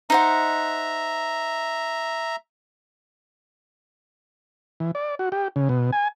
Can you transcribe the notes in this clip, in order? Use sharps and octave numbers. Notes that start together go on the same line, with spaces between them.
D#4 C5 E5 F#5 A#5
E3
D5
F#4
G4
C#3
B2
G#5